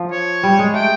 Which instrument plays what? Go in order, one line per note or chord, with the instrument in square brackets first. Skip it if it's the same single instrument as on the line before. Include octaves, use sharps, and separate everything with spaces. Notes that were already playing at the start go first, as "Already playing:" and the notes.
Already playing: [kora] F3
[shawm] C#5
[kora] G3
G#3
[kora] A3 [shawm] G5